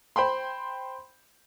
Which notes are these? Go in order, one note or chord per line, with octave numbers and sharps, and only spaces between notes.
C5 G5 B5 C6